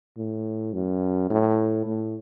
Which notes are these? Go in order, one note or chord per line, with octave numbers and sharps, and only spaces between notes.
A2
F#2
A2
A2